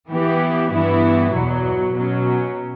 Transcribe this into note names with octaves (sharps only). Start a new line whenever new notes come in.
E3 B3 E4 G4
G2 E3 B3 E4
E2 B2 F#3
B2 F#3 C#4